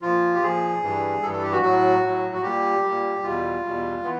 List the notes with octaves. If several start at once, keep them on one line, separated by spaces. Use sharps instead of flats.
A#2 F3 F4
G4
A#2 F3 G#4
G2 E3 G3
G2 E3 G3 A4
A4
G4
F#4
A2 F#3 F#4
A2 F#3
F#4
A#2 G3 G4
A#2 G3
E2 B2 G3 F4
E2 B2 G3
E3 B3